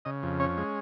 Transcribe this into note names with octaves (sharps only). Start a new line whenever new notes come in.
C#3 D#5
F2
C#4 C#5
G#3